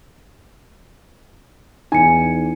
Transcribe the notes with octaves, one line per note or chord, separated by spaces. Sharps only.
E2 D#4 G#5 C#7